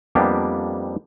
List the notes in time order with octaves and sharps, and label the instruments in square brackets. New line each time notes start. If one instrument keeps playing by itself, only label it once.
[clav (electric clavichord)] F2 G3 A#3 B3 D4 G4